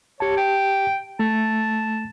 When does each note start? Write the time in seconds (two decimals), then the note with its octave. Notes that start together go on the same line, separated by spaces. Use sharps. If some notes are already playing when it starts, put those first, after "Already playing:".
0.20 G4 C#5 A5
0.37 G5
1.19 A3 A5